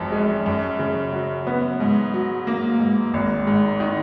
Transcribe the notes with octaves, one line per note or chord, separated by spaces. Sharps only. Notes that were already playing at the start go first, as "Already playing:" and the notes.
Already playing: G#1 F#2 F3
G#3
F#2
C#3
F#3
B3
G#2
F#3
A#3
G#2
G#1
G#2
D#3